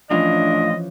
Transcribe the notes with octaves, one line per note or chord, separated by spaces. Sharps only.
A2 E3 F3 C#4 D4 F4 D#5